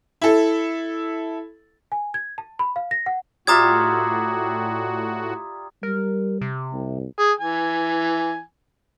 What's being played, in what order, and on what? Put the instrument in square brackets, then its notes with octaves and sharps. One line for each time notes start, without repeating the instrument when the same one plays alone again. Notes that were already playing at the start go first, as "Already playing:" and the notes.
[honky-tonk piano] E4 A4
[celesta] G#5
G#6
A5
B5
F5
A#6
F#5
[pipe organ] A2 F#4 [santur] G3 F4 E5 [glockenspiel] A#5 D#6 G#6
[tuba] G3 [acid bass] A#4
[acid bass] C3
[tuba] C2
[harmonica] G#4
E3 G#5